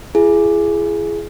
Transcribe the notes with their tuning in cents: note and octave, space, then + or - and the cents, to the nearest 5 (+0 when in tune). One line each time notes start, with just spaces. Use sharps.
E4 +45 G#4 +10